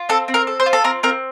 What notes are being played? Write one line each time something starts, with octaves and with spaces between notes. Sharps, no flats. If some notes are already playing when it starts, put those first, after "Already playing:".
Already playing: F4
C4 A4
C4
A#4
A4
C5
F4
A4
C4 A#4
C4 A#4